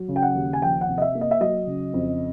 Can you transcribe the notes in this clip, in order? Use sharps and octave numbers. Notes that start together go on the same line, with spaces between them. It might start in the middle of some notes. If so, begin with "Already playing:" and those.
Already playing: F#3
C#3
G5
F#5
D#2
G#5
F3 G5
F#5
C3
D#5
E5
A#3
D#5
E5
F#3 D#5
C#3
F2